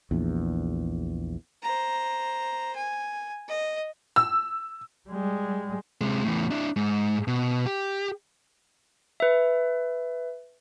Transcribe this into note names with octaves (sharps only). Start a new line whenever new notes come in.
A#1 E2
C5 A#5
G#5
D#5
E6
G3 G#3
C3 G#3
E2 A2
D4 E4
G#2
B2
G4
B4 E5